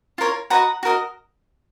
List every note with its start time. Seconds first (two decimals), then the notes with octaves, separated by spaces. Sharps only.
0.18 F4 A#4 C#5
0.50 F#4 B4 D#5 F#5 A#5
0.83 F#4 A#4 D#5